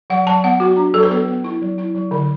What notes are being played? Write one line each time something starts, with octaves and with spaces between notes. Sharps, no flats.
F#3 F#5
F#3 A5
B3 F#5
F#3 F#4
D4
F#3 A4
B4
B3 A4
B3
E4
F#3
E4
F#3
D3